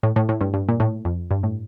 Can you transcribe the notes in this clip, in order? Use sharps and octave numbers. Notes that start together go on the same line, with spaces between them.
A2
A2
A2
G2
G2
A#2
A2
F2
G2
A2